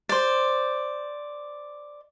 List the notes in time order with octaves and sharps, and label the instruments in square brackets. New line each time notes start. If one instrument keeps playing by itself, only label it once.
[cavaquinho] C5 D5